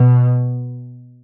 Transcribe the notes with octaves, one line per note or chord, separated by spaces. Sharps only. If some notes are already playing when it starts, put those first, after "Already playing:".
Already playing: B2